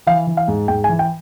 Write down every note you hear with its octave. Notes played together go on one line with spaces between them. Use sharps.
E3 F5
E3
F5
G#2
G#2 G5
G#5
E3
G5